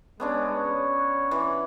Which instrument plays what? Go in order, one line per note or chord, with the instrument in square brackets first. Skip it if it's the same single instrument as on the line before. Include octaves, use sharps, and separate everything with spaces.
[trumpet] G#3 [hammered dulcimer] B3 C#4 D4
[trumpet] C#5
[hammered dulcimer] E3